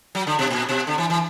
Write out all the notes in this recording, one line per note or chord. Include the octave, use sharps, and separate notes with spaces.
F#3
D3
B2
A#2
B2
D3
E3
E3